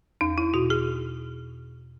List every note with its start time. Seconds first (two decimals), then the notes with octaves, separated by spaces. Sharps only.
0.21 E2 D#4
0.38 E4
0.54 B2 F#4
0.70 G#4